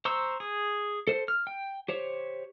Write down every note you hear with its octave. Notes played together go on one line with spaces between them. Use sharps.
C5 A#5 C6 C#6 E6
G#4
A4 C5
F6
G5
G4 C5 C#5